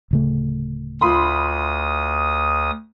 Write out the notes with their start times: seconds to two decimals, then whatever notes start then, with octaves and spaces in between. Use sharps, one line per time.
0.11 D1 C#3 A3
1.01 D2 F4 B5 C6 D#6